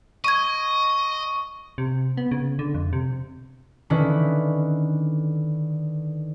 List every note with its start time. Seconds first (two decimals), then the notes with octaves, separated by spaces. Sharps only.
0.24 D#5 C#6 G#6 D#7
1.78 C3
2.17 B3
2.31 C#3
2.59 D3
2.74 F2
2.93 C3
3.90 D3 D#3 C#4 E4 B4